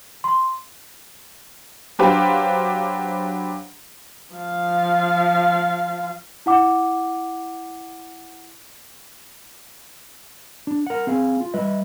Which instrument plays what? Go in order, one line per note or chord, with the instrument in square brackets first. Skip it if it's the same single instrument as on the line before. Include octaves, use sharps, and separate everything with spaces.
[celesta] C6
[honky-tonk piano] F#3 D4 G4 B4 C5 F5
[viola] F3 F5
[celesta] E4 F#5 D6
[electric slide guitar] D4
A#4 F#5
C4 G#4 F5 G#5
F4
G3 B4 D#5 E5